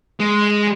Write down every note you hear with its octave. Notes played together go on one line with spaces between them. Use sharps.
G#3